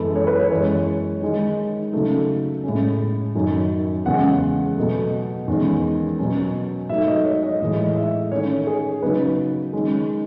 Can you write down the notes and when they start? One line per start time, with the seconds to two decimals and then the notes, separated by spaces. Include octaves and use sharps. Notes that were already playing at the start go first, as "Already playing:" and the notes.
Already playing: F#2 E3 G#3 B3 A4
0.16 C#5
0.27 B4
0.39 C#5
0.51 F#2 E3 G#3 C#5
1.22 D#3 G#3 D#4
1.93 C#3 F#3 A3 D#4
2.64 A2 G#3 C#4
3.35 F#2 D#3 F#3 C#4
4.06 E2 C#3 G#3 C#4 F#5
4.77 B2 F#3 A3
5.48 E2 D#3 G#3 C#4
6.19 B2 F#3 C#4
6.89 G#2 F#3 A3 D#4 E5
7.07 D#5
7.25 C#5
7.43 D#5
7.60 A2 E3 G#3 D#5
7.96 E5
8.31 D#3 A3 C#4 C#5
8.67 G#4
9.02 C#3 F#3 B3 D#4 B4
9.73 D#3 G#3 C#4